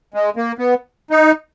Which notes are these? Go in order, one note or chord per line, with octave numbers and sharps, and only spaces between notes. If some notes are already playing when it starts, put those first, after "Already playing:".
G#3
A#3
B3
D#4